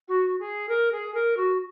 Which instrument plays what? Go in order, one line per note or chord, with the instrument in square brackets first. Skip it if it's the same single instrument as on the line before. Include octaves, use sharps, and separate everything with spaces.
[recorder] F#4
G#4
A#4
G#4
A#4
F#4